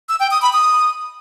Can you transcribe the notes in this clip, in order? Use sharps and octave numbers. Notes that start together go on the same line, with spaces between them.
E6
G5
D#6
B5
D#6